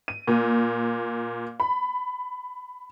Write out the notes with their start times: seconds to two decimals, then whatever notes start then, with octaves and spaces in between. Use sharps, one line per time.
0.08 D#7
0.27 A#2
1.60 B5